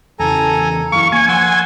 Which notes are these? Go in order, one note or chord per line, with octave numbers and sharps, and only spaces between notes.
E2 C#3 E3 A4 G#5 A#5
F#2 E3 F5 C#6
A#3 G#5
F3 F#5 C6 E6